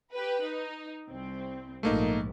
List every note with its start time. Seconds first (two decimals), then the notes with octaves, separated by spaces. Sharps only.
0.13 G4 B4
0.43 D#4
1.08 C2 C4
1.83 A#1 G#2 A3 A#3 D#4